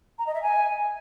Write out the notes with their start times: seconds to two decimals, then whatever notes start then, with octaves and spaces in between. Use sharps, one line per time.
0.19 A#5
0.27 D#5
0.35 E5
0.42 G#5